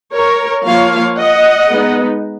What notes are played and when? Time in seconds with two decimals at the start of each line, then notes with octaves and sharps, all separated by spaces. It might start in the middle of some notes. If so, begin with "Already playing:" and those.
0.13 A#4 C#5
0.64 F3 A#3 F4 C#5 F5
1.16 D#5 F#5
1.68 G#3 B3 D#4